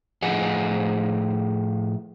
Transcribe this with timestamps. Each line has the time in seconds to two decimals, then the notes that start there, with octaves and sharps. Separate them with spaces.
0.22 A2 F3 G#4 D#5 F#5 G#5